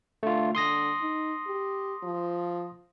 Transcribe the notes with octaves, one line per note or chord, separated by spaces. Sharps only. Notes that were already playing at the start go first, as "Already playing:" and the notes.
D3 A3 F4
D3 C6 D#6 A#6
D#4
G4
F3